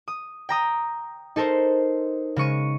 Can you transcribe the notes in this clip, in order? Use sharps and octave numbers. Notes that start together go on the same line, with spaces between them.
D#6
G5 A#5 D#6
D#4 A4 A#4 C5
C#3 G#3 C#6 D#7